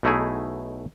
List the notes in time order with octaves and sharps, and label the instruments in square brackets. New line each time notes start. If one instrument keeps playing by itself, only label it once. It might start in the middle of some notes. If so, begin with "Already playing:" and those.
[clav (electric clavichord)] B1 B2 A3 D#4 E4 G#4